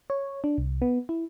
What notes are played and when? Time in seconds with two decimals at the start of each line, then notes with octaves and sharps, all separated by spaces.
0.10 C#5
0.44 D4
0.58 C2
0.82 B3
1.09 E4